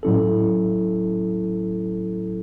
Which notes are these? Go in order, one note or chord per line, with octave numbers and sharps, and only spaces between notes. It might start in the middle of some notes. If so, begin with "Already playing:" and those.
A2 F#3 C#4 E4 A4